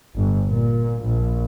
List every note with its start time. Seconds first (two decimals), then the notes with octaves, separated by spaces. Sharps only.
0.16 G1
0.48 A#2
1.03 A#1